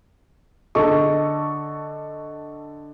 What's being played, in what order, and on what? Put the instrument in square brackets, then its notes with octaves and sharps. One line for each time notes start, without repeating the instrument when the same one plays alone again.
[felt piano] D3 A4 D#5 C#6